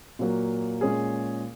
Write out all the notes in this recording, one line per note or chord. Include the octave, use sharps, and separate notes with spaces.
A#2 F#3 A#3
A#2 G#3 C#4 G#4